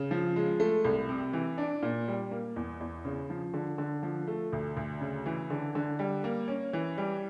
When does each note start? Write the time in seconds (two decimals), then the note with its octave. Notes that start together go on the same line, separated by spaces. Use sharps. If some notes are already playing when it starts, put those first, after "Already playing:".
Already playing: C#3
0.11 F3
0.36 G#3
0.60 A3
0.84 C2
1.09 C3
1.33 E3
1.58 D4
1.82 A#2
2.08 G3
2.31 A#3
2.56 E2
2.80 E2
3.05 C#3
3.30 F3
3.54 D3
3.78 D3
4.03 F3
4.28 A3
4.53 D2
4.77 D2
5.01 C#3
5.26 E3
5.50 D3
5.75 D3
5.99 G3
6.24 A#3
6.48 C#4
6.73 E3
6.98 G3